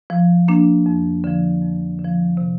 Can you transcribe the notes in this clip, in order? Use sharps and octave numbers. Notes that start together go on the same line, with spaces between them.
F3
A#3 D4
F2
D3 F3
F2
D3
F3
C3